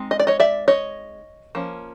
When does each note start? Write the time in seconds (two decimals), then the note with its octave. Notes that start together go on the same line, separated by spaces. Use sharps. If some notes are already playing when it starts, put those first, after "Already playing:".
Already playing: G#3 C4 D#4
0.11 D#5
0.20 D5
0.27 C#5 D#5
0.40 D5 E5
0.68 C#5 D#5
1.55 F3 A#3 C#4